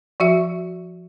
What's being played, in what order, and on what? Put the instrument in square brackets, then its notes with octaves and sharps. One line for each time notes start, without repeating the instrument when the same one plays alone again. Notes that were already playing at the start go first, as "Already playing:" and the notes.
[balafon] F3 F#4 E5